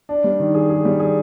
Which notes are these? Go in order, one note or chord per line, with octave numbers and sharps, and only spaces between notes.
D4
G3
D#3
G#4
G#4
G3
G#4